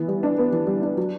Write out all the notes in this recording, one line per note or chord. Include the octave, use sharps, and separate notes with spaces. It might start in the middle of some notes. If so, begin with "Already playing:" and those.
Already playing: E3 B3
G3
D4
B3
E3
G3
D4
F#3